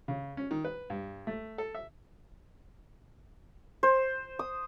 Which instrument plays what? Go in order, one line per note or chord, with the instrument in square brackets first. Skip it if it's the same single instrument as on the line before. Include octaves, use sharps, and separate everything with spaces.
[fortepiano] C#3
C#4
D#3
B4
G2
A3
A4
E5
[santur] C5
D#6